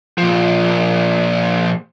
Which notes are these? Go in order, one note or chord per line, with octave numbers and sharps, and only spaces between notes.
A#2 F3